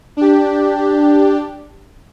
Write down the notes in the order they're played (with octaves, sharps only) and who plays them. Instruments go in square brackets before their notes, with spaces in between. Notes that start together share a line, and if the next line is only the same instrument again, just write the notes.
[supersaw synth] D4 G4